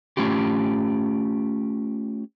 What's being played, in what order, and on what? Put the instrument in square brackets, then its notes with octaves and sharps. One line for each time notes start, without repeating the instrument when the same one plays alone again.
[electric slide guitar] A3 C#4 F4 G4